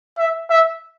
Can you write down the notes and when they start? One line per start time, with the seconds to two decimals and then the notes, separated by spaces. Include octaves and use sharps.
0.19 E5
0.50 E5